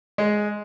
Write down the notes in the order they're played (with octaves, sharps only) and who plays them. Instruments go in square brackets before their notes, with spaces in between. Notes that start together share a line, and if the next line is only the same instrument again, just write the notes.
[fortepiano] G#3